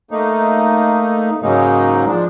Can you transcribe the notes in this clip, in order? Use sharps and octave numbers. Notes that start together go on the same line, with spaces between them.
A3 A#3 D#4
G#2 C#3 F#3 G#3 A#3 D#4
F3 G#3 D4